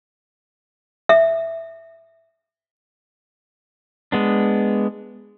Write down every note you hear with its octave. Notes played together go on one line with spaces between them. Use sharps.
E5
G#3 B3 D4